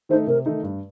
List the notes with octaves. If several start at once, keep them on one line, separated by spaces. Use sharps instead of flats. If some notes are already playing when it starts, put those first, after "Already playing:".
D#3 A3 D#4 C5
C3 A#4
D#3 A3 D#4
G2